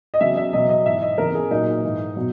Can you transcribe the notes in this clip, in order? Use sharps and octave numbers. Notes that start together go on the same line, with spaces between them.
D#5
E2 C#3 F#3 E5
E5
E2 B2 F#3 D#5
D#5
G#2 E3 E5
D#5
E2 C#3 E3 A#4
G#4
A#2 F#3 D#4
G#2 E3
B2 F#3